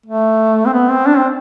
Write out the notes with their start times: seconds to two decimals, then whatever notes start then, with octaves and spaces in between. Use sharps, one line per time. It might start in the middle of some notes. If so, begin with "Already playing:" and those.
0.06 A3
0.66 C4
0.73 B3
0.90 C4
1.07 D4
1.17 C4